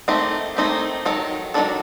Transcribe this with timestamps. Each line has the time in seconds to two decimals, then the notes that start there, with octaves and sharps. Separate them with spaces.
0.08 D#3 A3 C4 D#4 G4
0.56 D#3 A3 C4 D#4 G4
1.06 D#3 F#3 A4
1.54 D#3 F#3 A3 D4 A4